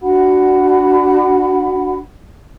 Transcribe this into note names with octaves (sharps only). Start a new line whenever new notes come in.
D4 F#4 F#5 B5